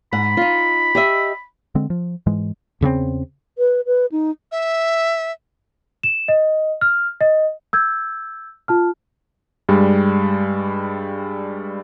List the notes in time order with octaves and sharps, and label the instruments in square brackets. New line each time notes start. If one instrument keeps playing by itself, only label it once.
[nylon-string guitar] G#2 F#5 [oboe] B5
[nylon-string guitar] D#4 F4
G4 D#5 E5
[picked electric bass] D3 G#3 C4
F3
G#2 E3 G#3
[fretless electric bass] E2 C#3 B3 C4
[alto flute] B4
B4
D#4
[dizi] E5
[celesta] E7
D#5
F6
D#5
E6 G6 G#6
F4 A5 F6
[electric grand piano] G2 G3 G#3